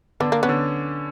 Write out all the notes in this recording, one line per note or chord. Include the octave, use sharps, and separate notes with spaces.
D3 B3 D4
A#3
B3 C#4
D3 D4